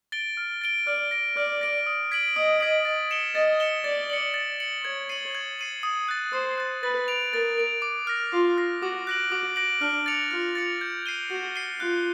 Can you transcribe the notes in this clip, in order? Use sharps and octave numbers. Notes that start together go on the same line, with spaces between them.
A6 D7 G7
F6
A6 D7 G7
D5 F6
A#6 D7
D5 F6
A#6 D7
D#6
G#6 B6 D7 F#7
D#5 D#6
G#6 B6 D7 F#7
A6
C#7 E7 G7
D#5 A6
C#7 E7 G7
D5 A6
C#7 F#7
A6
C#7 F#7
C#5 G#6
C7 D#7 F#7
G#6
C7 D#7 F#7
D#6
F#6 A6
C5 D#6
F#6 A6
B4 A6
D7 F7
A#4 A6
D7 F7
D6
F6 A#6
F4 D6
F6 A#6
F#4 D6
F#6 A#6 D7 F#7
F#4 D6
F#6 A#6 D7 F#7
D4 F6
A6 C#7 F7
F4 F6
A6 C#7 F7
G6
C7 D#7 G7
F#4 G6
C7 D#7 G7
F4 F#6